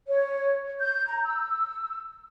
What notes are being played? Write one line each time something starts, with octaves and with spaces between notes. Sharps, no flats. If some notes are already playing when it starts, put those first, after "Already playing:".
C#5
G6
A#5
E6